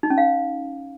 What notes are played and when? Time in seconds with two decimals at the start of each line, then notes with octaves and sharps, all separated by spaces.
0.03 D#4
0.10 C#4
0.18 F5